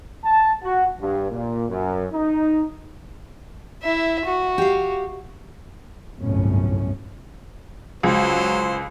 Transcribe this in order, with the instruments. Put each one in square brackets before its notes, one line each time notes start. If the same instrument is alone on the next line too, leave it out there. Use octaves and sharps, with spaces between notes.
[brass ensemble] A5
F#4
G2
A#2
F#2
D#4
[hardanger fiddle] E4 E5
F#4
[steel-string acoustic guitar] G4 F5
[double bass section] G1 C2 F#2 A2 C#4
[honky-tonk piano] C#2 [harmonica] F#3 C5